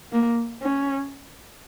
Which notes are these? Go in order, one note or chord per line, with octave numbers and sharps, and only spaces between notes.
A#3
C#4